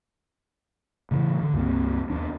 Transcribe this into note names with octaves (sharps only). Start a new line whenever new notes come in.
A2 C#3 E3
D3
C#2 G2 A#3 C4
D#2 B3 D4